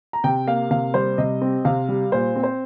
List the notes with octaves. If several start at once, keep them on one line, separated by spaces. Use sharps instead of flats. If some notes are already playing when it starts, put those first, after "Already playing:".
A#5
C3 G5
A#3 F5
C3 F5
G3 C5
C3 D#5
C4
C3 F5
G3
A#2 C5
C4
C5